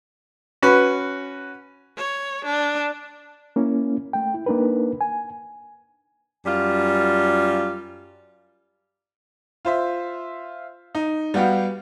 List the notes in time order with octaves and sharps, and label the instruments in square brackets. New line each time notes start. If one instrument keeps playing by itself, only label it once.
[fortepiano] C#4 F#4 B4
[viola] C#5
D4
[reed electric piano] A#3 C#4 E4
A3 G5
E4
A#3 D4 D#4 A#4 B4
G#5
[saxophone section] F#2 G3 F4
[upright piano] F4 C5 E5
D#4
G3 B3 F#4 G4 F5